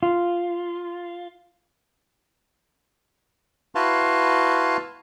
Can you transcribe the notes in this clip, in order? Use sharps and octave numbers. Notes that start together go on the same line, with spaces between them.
F4
E4 F#4 B4 F5 A5 C6